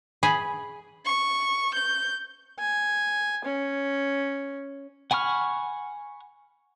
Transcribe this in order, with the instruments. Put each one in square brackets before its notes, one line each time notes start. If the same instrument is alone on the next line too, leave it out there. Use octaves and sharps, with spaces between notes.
[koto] G#4 [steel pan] B5
[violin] C#6
G6
[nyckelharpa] G#5
C#4
[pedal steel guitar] F#5 G#5 B5 C#6 F6